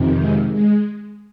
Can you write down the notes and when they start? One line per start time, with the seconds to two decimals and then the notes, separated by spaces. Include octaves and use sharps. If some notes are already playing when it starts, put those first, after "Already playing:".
Already playing: F2 C3 D#3
0.19 G#3
0.52 G#3